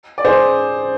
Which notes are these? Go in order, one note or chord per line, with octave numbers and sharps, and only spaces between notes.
D5
G#4 C5